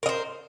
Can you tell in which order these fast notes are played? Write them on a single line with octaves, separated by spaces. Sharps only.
A#4 D#5 C5